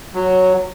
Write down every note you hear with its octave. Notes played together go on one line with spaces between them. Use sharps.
F#3